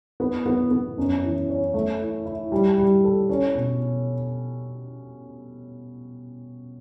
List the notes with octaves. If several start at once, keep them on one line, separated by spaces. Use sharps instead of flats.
B3
B3
B3
F#2
E3
C#4
A3
E4
E4
G3
G3
A4
C#4
B2